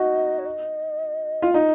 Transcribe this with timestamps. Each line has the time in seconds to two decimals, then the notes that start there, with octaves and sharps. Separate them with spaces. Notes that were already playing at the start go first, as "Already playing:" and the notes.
Already playing: D#4 F#4 D#5
0.39 C#5
0.46 D#5
1.42 F4
1.54 D#4 D#5